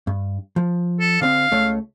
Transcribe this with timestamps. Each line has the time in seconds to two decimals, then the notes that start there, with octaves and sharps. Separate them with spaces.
0.07 G2
0.56 F3
1.00 A4
1.21 D3 C4 F5
1.51 C#2 A3 C#5